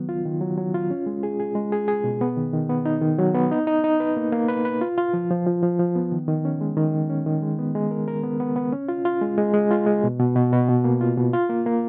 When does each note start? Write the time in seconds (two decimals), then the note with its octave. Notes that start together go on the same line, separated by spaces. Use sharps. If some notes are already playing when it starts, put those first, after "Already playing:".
Already playing: D#3 F#3 B3
0.09 F4
0.25 D#3
0.41 F#3
0.58 F#3
0.74 F4
0.91 C#4
1.06 G#3
1.23 G#4
1.40 G#4
1.55 G#3
1.72 G#4
1.88 G#4
2.04 B2
2.21 B3
2.37 D#3
2.53 D#3
2.69 B3
2.86 D#4
3.01 D#3
3.18 F#3
3.34 B3
3.51 D#4
3.67 D#4
3.84 D#4
4.00 B4
4.17 A#3
4.32 A#3
4.48 B4
4.65 B4
4.81 F4
4.98 F4
5.14 F3
5.31 F3
5.46 F3
5.63 F3
5.79 F3
5.96 B3
6.12 D#3
6.28 D#3
6.45 C#4
6.61 G#3
6.77 D#3
6.93 D#3
7.10 C#4
7.26 D#3
7.42 G#3
7.59 B3
7.75 G#3
7.91 A#4
8.08 A#4
8.23 B3
8.40 B3
8.56 B3
8.72 C#4
8.88 F4
9.05 F4
9.21 G#3
9.38 G#3
9.53 G#3
9.71 F4
9.86 G#3
10.03 B2
10.19 B2
10.36 B2
10.52 B2
10.69 B2
10.84 A#3
11.01 F4
11.17 B2
11.33 F4
11.50 A#3
11.66 A#3